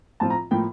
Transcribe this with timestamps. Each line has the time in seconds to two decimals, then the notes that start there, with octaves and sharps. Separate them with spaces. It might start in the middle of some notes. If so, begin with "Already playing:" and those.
0.20 A2 F3 C4 F4 A5
0.30 A#5
0.51 A2 F3 A#3 G5